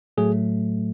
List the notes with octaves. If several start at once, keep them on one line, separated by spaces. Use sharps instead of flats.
A2 F#3 A3 G#4